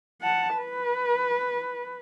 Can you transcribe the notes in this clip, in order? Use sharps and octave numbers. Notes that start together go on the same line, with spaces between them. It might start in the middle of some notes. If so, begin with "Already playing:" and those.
F#5 A5
B4